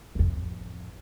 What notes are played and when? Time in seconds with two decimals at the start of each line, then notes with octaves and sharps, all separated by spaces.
0.15 A1 F2